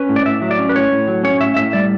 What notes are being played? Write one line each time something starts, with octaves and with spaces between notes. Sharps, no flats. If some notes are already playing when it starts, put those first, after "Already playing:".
Already playing: C#4 B4
A2
D5
A2 E5
F#3
D5
C#4
B4
A2 C#5
A2
F#3
C#4 C#5
A2 E5
A2 E5
G3 D5